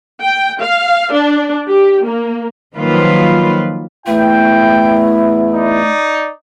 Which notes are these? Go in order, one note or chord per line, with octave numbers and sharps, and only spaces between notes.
G5
F5
D4
G4
A#3
D#3 F3 F#3 A#3 F4 B4
E2 A3 B3 E4 G5
D#4 D5